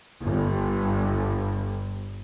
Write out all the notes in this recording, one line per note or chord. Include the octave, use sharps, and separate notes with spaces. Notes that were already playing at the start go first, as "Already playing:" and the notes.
G1 G2